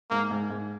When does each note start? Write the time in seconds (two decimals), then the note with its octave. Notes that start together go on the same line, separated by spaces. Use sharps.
0.11 G#2 A#3
0.31 G#2
0.50 G#2